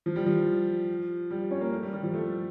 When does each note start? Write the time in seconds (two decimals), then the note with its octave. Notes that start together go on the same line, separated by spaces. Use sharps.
0.06 F3
0.16 G3
0.26 F3
1.30 G3
1.51 C#4
1.61 A#3
1.72 A3
1.83 G3
1.93 G3
2.03 F3
2.14 A3